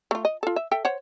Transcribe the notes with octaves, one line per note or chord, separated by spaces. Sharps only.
A3 F4
D#5
F4 A4
E5
A4 E5 G5
C5 C#5 F#5